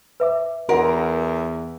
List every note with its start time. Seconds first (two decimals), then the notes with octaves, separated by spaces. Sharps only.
0.20 B4 E5 D6
0.69 E2 F#4 A#4 D#5 F#5